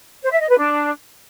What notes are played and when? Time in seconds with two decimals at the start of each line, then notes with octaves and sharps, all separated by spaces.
0.23 C5
0.32 E5
0.41 D#5
0.49 B4
0.58 D4